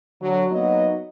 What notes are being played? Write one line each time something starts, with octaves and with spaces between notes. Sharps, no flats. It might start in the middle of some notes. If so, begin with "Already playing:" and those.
D3 F#3
F#3 A#3 B3 D#4 D#5